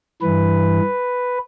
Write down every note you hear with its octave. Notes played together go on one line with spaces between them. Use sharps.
G2 E3 B4